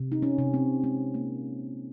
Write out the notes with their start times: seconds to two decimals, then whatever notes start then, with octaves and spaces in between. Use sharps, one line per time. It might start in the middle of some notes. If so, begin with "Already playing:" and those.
Already playing: C3
0.12 D#4
0.22 C#4
0.38 C3
0.54 C4
0.83 G#3 C4
1.14 A#3